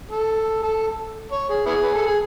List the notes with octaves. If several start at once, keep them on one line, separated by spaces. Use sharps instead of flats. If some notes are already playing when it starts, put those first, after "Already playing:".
A4
A4
C#5
G#4
B3 E4 G#4
B4
A4
G#4